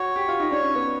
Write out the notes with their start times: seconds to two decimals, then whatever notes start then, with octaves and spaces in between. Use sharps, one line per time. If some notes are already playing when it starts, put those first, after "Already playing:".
Already playing: F#4 C#5
0.16 G4
0.29 F4
0.40 D#4
0.51 D4 C#5
0.63 C#4
0.75 B3